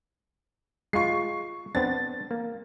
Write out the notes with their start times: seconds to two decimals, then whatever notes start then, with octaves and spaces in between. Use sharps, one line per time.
0.93 G#3 F4 C#6 C7
1.75 B3 C4 D4 A6
2.31 A#3